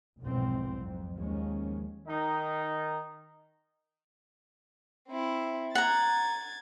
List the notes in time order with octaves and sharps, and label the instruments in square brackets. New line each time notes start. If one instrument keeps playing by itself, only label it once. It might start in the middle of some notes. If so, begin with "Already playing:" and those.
[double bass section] F1 B1 E2 G#2 C4
F2
D#2 F3 G#3 C#4
[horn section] D#3 D#4
[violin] C4 E4
[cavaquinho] F#5 A#5 [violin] G#6 A6